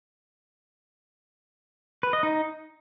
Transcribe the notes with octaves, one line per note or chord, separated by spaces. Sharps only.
B4
D#5
D#4